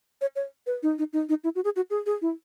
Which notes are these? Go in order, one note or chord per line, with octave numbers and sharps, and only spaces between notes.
C#5
C#5
B4
D#4
D#4
D#4
D#4
E4
F#4
G#4
F#4
G#4
G#4
E4